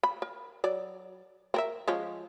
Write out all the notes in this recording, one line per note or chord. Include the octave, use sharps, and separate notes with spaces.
B5
A#4
F#3 D5
C4 A#4 E5
F3 G#3 C#4